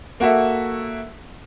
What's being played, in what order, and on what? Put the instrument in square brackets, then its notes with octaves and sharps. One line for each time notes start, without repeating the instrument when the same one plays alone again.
[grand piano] A#3 F#4 A4 E5